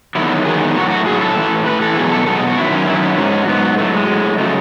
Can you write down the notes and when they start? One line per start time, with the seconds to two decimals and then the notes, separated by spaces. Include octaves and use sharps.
0.15 E2 D#3 F#3 E4
0.45 E2 D#3 F#3 G#4
0.75 A2 F#3 F#4
0.90 F#4
1.06 A2 F#3 G#4
1.21 A4
1.36 A2 E3
1.66 A2 E3 B4
1.81 A4
1.96 E2 B2 F#3 G#4
2.12 A4
2.26 E2 B2 F#3 A4
2.37 G#4
2.47 F#4
2.57 F#2 D#3 F#3 E4
2.72 C#4
2.87 F#2 D#3 F#3 E4
3.02 E4
3.18 G#2 F#3 C#4
3.48 G#2 F#3 B3
3.78 A2 F#3 A3
3.93 G#3
4.08 A2 F#3
4.38 C#3 F#3 A3